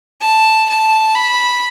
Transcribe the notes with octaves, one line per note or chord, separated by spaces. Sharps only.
A5
A5
B5